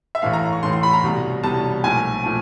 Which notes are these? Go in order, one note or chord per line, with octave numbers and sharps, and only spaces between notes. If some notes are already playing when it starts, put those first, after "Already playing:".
E5
A1 A2 E3 A3 F5
A#5
C#6
A1 A2 E3 A3 C6
C6
B5
A#5
C2 B2 G3
C2 B2 G3 A5
B1 A#2 F3 A3 G#5
A#2 F3 A3